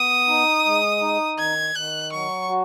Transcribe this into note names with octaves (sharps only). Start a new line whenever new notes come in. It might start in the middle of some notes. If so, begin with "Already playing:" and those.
Already playing: B3 D#6
D#4
G#3
D#4
D#3 G#6
D#3 F#6
F#3 C#6
F#4